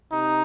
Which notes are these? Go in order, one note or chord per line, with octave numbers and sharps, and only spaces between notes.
C3 D#4